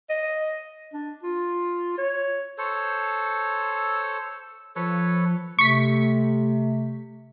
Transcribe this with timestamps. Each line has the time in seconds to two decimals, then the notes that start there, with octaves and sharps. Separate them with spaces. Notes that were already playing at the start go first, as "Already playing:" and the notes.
0.10 D#5
0.93 D4
1.23 F4
1.98 C#5
2.58 A4 C5 C#5
3.62 E6
4.76 F3 A4 B4 C#5
5.59 C3 A3 C#6 B6